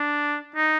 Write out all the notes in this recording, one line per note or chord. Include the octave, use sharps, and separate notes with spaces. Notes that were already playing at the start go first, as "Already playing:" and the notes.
Already playing: D4
D#4